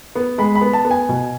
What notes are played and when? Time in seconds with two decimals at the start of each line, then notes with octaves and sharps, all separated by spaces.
0.15 B3
0.38 G#3 B5
0.55 B5
0.61 B3
0.73 A5
0.85 B3
0.91 G#5
1.09 B2